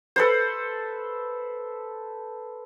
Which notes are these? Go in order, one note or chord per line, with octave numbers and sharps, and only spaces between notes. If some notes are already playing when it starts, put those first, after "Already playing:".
A4 B4 C5